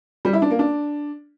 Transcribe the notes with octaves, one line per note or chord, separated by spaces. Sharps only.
G3
E4
D4
A#3
D4